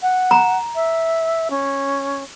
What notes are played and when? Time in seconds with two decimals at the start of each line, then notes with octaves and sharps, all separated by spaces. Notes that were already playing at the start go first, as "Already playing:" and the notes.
0.02 F#5
0.31 A#5
0.75 E5
1.50 C#4